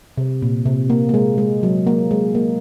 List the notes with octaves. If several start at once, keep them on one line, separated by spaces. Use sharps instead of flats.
C3
A#2
C3
A#3
A#3
G#3
G#3
F#3
A#3
G#3
A#3